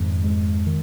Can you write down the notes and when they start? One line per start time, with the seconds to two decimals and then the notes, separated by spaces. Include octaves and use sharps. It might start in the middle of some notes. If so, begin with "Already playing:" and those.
Already playing: F2 G#2 D#3
0.24 G#3
0.67 D#3